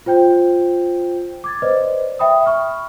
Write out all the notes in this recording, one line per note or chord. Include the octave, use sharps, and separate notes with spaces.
F4 C5 G5 G6
D6 G#6 A6
B4 C5 D5 D#5
E5 G5 B5 D#6
B5 C#6 F6